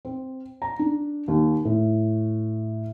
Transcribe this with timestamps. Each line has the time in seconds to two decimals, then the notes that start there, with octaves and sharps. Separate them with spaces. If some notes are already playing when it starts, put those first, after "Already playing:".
0.05 C4
0.62 A#5
0.79 D4
1.28 D#2
1.65 A2